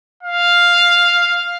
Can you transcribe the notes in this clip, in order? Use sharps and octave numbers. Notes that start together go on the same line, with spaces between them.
F5